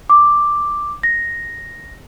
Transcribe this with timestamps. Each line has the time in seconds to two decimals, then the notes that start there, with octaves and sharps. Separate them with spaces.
0.10 D6
1.03 A#6